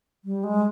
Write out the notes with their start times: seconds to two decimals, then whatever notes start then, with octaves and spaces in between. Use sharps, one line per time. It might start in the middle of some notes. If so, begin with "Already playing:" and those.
0.25 G3
0.44 G#3